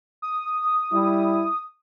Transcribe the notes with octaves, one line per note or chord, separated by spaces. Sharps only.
D#6
G3 E4